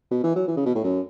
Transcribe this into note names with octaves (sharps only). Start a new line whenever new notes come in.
B2
E3
F#3
E3
C#3
B2
A2
F#2